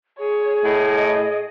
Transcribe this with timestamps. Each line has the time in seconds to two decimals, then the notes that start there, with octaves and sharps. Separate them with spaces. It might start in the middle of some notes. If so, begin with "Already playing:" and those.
0.19 G#4 C#5
0.64 A2 D#5